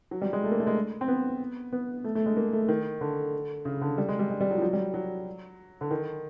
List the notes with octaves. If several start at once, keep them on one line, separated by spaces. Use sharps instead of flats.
F#3
G3
G#3
A3
A#3
A3
G#3
C4
B3
B3
A3
A3
G#3
A#3
A3
D#3
D3
C#3
D3
G3
G#3
G3
G#3
G3
F#3
F3
F#3
G3
F#3
D3
D#3